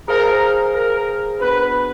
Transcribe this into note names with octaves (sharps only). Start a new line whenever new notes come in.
G#4 A#4 C5 F5 A5
A#4
B3 D4 F#4 B4